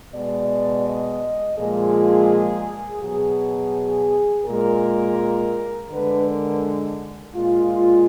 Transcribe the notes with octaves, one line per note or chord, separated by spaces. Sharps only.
B2 G#3 D5
D#5
A#2 F3 G#3 G#4
B2 F#3 G#4
A#2 G#3 A#4
D3 G#3 B4
A#4
A#2 G#3 F4